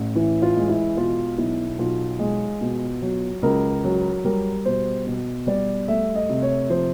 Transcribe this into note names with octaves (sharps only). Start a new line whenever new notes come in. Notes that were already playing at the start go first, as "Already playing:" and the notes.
Already playing: A1
E3 E4
F4
G#3
E4
B2 F4
B1 E4
B1 F4
G#3
B2
F#3
C#2 A#4
F#3
G3 A#4
B2 C5
B2
G3 D5
A3 E5
D#5
C3
C#5
F3 C5